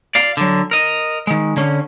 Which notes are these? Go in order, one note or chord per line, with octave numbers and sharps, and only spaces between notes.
D5 F5
D3 F#3
A#4 D#5
D#3 G#3
D3 C#4